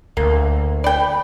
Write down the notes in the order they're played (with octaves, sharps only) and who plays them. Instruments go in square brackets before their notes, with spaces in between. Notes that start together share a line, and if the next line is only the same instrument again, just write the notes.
[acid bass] D2 [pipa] A#3
[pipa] D5 G5 [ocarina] B5